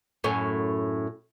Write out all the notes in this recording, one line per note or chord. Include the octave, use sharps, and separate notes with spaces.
F#2 A2 C#4